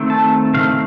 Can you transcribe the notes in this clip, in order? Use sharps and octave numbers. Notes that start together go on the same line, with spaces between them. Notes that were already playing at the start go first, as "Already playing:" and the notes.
Already playing: D#3 A3 C4
A5
D#3 A3 C4 F5